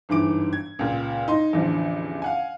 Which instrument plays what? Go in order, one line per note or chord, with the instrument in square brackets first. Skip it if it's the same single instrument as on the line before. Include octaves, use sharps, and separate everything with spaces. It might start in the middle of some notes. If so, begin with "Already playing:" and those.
[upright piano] G1 G#2 E3 D6 D7
G#6
C#2 A#2
D#4 C6
A1 E2 D3 F3
F5 F#5 G#5